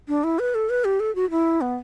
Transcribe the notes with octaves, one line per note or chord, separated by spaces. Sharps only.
D4
E4
B4
A4
B4
G4
A4
F#4
E4
B3